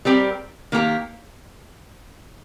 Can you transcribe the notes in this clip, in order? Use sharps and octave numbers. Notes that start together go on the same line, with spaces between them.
G3 C4 G4 A#4
D#3 A#3 G4 A#4